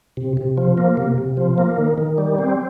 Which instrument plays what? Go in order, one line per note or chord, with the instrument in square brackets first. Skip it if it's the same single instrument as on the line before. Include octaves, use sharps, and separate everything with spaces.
[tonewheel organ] C3
C3
F3
A#3
C3
C3
F3
A#3
D#3
D#3
G3
C4